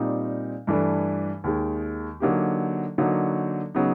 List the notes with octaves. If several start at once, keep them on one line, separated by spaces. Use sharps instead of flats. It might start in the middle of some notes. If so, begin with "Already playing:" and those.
Already playing: A#2 G3 C4 D#4
G2 E3 A3 D4
D#2 D#3 G#3
D3 F#3 A#3 D#4 G4
D3 F#3 A#3 D#4 F#4
C#3 F#3 B3 D#4